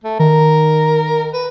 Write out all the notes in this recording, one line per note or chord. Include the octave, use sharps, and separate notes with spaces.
A3
D#3 A#4
B4